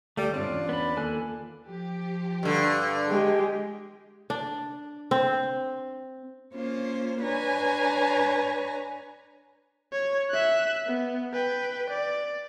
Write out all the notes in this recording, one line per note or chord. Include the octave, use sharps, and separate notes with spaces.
D2 G3 A3
G2 C4 D4 F4 C#5
E2 C#4
B3 B5
D#2 A#3 F4 A4 G#5 F#6
F3 G4
G2 D3
G#3 G4
D4
C4
A#3 C#4 F4 C5
D4 B4 C#5 G#5 A#5
C#5
E5 F#6
B3
B4 G5
D5